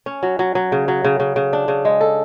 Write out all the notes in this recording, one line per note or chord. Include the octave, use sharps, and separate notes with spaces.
C#4
F#3
F#3
F#3
C#3
F#3
C#3
C#3
C#3
D4
C#3
G#3
A4